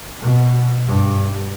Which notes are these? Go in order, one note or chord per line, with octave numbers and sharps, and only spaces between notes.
B2
G2